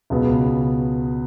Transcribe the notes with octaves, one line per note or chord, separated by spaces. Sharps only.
C#2 B2 B3